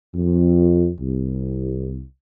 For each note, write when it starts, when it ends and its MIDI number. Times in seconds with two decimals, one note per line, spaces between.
0.15 0.91 41
1.01 2.03 36